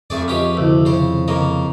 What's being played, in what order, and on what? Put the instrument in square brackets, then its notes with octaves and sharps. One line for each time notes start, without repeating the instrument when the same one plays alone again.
[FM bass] F2 [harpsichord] A3 G#4 D5
[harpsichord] C#4 G4 G#4 [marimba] F4 B4 D#5
[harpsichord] D2 [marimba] C3 D#3 E4
[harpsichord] C#3 C5
C#3 A#3 D#5